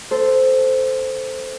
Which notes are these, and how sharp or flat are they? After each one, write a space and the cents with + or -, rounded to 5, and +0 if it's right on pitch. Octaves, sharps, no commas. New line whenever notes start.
A4 +0 C5 -10